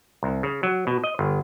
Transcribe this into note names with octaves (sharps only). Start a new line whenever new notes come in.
C2
C#3
F#3
B2
D#5
G1